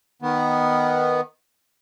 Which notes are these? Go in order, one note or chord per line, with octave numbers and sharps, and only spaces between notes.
D#3 B3